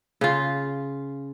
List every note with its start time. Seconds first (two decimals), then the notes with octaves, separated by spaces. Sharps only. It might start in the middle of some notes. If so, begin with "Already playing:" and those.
0.21 C#3 F4